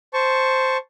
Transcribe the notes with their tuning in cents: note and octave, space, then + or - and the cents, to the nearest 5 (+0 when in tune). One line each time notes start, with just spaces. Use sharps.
C5 +0 A5 +0 C#6 +0